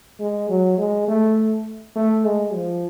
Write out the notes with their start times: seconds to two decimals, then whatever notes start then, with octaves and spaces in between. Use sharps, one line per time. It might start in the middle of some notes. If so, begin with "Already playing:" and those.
0.20 G#3
0.49 F#3
0.78 G#3
1.08 A3
1.96 A3
2.25 G#3
2.54 F3